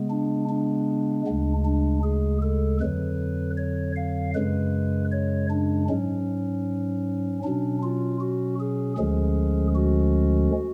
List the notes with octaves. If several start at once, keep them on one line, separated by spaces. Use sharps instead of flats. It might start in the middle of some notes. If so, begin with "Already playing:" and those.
Already playing: C#3 G#3 B3
D4
D4
D2 C#3 G#3
D4
G#4
A4
F2 D3 F#3 B4
C#5
F5
F#2 C#3 G#3 B4
C#5
D4
G#2 F#3 C#4
B2 F#3 C#4 D4
F4
F#4
G#4
D2 D3 F3 G#3 C#4 G#4
F#4